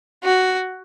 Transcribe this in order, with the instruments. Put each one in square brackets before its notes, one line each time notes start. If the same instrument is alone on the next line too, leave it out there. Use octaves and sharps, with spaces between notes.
[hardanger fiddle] F#4